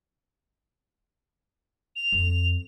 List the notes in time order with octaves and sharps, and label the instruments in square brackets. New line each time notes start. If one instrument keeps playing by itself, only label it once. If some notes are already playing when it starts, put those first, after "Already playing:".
[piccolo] F7
[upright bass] F2